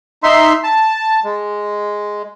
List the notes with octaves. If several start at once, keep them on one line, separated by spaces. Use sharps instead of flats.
D#4 E5 C6
A5
G#3